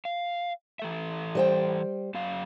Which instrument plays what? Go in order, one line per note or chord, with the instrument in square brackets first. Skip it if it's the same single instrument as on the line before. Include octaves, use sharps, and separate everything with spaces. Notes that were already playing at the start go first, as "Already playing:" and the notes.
[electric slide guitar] F5
E3 A4 E5
[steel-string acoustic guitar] G3 C5 G5
[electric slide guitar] F#2 F#3 F5